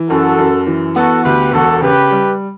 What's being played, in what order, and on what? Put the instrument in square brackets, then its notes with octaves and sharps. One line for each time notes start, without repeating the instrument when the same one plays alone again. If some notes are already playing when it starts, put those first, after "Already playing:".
Already playing: [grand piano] E3
[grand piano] F#2 [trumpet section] F#4 A4
[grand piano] F#2
E3
[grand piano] B3 [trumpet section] F#4 A4
[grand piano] D2 [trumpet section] G4 B4
[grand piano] E1 [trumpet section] F#4 A4
[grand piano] C#3 [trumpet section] G4 B4
[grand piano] G3